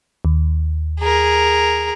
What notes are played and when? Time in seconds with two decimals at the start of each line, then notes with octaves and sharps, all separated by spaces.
0.25 D#2
1.00 G#4 A#4